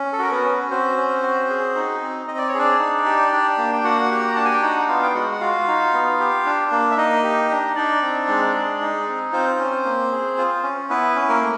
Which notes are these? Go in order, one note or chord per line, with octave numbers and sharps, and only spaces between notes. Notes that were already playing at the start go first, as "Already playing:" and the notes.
Already playing: C#4
A4
F#4 A#4
B3 B4
C#4
C4 F#4 C5
C#4
F#4
G#4
D#4
C4
C4 D#5
D5
C#5
D4 G#4 D5
D#4
G4
D4
A#3
G5
A#3 F#4 F#5
G4
A#5
D4 A5
G#5
G5
D#4 F#4 F#5
B3 F4 F5
G5
G#3 F#4 F#5
F#5
F4 F#4 F5
D#4
B3
G4
D4
A#3
E5
A#3 D#4 D#5
G4
D4
D4 D#4 D5
C4
G#3
G#4
D#4
C4
C4 F4 C5
C#4
A#3
G#4
F4
C#4
B3 E4 B4
C#4
A#3 A#4
A3